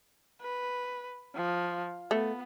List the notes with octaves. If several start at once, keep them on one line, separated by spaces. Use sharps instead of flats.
B4
F3
A3 B3